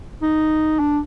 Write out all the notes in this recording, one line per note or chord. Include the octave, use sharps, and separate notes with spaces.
D#4
D4